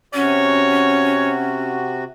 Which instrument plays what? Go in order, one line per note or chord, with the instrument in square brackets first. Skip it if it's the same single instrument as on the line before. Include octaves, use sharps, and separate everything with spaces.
[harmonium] C3 F#4 [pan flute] C#4 [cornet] C#5